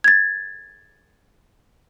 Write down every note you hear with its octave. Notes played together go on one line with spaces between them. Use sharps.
G#6 A6